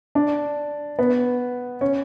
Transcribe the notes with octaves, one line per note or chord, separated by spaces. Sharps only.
D4
B3
C#4